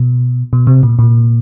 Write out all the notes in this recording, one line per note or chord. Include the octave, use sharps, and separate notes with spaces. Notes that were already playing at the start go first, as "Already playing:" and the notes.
Already playing: B2
B2
C3
A#2
A#2